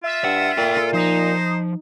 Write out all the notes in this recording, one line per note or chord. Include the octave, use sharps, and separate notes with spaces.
F4 E5
G2 F#5
A#2 A4 G5
A4
F3 D#4 C5